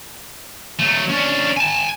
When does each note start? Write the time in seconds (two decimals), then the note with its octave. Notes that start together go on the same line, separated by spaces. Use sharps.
0.79 F#3 A3
1.10 C#4 D4
1.57 G#5 A5